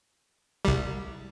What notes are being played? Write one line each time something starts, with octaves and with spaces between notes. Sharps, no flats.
C2 G3